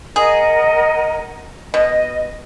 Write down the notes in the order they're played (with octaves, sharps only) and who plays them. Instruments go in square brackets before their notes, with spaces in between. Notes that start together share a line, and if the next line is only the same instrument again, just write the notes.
[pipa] G#4 [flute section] A#4 D#5 F#5
[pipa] B2 [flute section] D#5